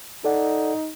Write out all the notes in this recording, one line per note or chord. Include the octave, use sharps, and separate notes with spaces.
D#4 A4 D5 F#5